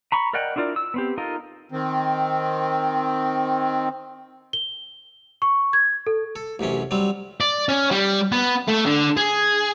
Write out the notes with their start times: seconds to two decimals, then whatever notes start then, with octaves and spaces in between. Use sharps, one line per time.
0.12 A#5 B5 C#6
0.33 A#4 D5 D#5 F#5 G5
0.56 D4 E4 F4 A#4 D5
0.76 E6
0.94 B3 C4 G4
1.18 D#4 F4 A4 A#4 D#5
1.72 D#3 C4
4.53 G7
5.42 C#6
5.73 G#6
6.07 A4
6.36 A4
6.59 A1 F#2 C3 C#4
6.91 F#3 G3 C4
7.40 D5
7.69 C#4
7.91 G3
8.32 B3
8.68 A3
8.86 D3
9.17 G#4